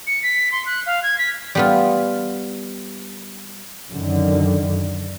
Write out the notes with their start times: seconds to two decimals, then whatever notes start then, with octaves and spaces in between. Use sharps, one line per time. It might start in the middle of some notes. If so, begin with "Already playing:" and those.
0.07 C#7
0.23 B6
0.52 C6
0.66 F#6
0.86 F5
1.03 G#6
1.18 B6
1.55 G3 B3 F4
3.90 F#2 D3 D#3